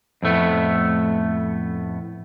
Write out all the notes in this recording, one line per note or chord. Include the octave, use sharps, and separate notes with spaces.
F2 A2 A3 B3